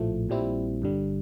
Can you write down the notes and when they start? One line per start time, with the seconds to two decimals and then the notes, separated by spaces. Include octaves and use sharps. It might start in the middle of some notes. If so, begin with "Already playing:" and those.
Already playing: A#1 A2 F3 A3
0.29 A#1 A#2 G3 C4 E4
0.82 G1 G2 D3 G3